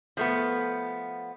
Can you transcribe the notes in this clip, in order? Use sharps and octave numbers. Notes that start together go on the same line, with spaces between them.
F3 A3 B3